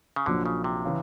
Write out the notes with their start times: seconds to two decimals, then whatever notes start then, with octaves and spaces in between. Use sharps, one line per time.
0.16 C#3
0.26 A#1 A#2 D3 F#3 A#3 D4
0.46 C#3
0.64 C3
0.85 C#3 E3